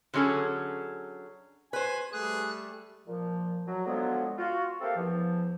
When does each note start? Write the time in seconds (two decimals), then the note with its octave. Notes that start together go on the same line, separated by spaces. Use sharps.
0.14 D3 F#3 C#4 G#4 A4
1.73 B4 C5 G#5
2.13 G3 A3 G#4 F#6
3.08 A#2 F3
3.68 F#3
3.86 D3 F3 F#3 G#3 B3
4.39 F4 F#4
4.81 A3 A#3 C4 G4 A4 F5
4.96 E2 F3